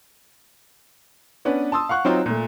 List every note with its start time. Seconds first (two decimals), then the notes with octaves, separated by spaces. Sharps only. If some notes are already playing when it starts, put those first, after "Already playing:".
1.45 B3 C#4 D4 B4
1.72 A5 C6 D#6 E6
1.89 F5 F#5 C#6 F#6
2.05 F#3 C4 D#4 F4
2.26 A#2 A3